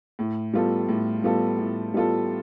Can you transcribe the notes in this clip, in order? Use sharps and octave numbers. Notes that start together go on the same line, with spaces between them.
A2
G3 B3 F4 A4
A2
G3 B3 F4 A4
A2
G3 B3 F4 A4